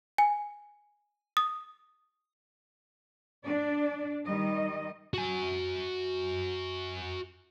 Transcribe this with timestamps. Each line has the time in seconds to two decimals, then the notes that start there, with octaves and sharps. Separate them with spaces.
0.18 G#5
1.37 D#6
3.45 D4 D5
4.25 D#3 G3 D#5
5.14 F#4 G#5